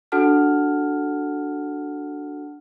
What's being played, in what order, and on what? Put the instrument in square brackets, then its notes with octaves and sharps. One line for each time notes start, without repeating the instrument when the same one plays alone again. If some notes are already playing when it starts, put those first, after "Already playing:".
[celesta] D4 F#4 A4 F#5 A5 F6